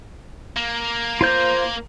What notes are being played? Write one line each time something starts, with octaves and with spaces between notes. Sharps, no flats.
A#3
F4 C5 G6